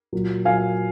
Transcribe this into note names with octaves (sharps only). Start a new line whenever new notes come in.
A#2 F#3
A#2 F#3 F5 G#5